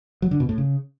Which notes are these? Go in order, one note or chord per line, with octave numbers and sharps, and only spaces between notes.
F#3
D3
B2
A2
C#3